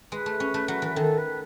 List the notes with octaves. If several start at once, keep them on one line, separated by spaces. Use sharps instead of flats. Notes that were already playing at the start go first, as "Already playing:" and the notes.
G#3 B4
A3
C#4
A3
F#3
E3
D#3 A4
B4